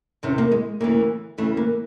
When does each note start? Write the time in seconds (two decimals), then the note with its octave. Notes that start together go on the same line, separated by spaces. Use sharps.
0.23 E2 C3 D#3 C#4
0.38 A#3
0.52 G#3
0.81 D2 C#3 E3 A#3
1.38 D2 C#3 E3 A3
1.57 A#3